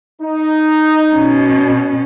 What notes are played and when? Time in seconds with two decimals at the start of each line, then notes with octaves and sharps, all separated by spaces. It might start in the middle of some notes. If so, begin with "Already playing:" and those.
0.22 D#4
1.13 B2 C#4